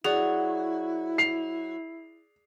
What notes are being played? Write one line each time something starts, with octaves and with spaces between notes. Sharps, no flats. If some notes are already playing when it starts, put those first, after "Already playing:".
F#3 E4 F#4 G#4 D5
C7 F7